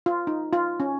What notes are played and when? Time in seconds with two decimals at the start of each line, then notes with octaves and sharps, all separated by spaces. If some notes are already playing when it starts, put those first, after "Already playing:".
0.06 F4
0.27 D#4
0.53 F4
0.80 C#4